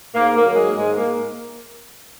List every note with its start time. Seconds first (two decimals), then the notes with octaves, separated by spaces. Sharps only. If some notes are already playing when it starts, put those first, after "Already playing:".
0.14 G#2 A#3
0.35 A#3
0.45 D#3 F#3
0.55 G#3
0.76 G#2 G#3
0.97 A#3